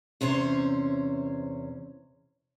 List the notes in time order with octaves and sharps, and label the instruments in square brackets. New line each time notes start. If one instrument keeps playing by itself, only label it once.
[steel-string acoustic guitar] E2 C3 C#4 C5 C#5